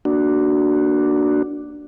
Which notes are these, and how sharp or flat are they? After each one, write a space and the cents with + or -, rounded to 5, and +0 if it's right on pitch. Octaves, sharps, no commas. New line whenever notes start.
A#3 +0 D4 +0 F#4 +5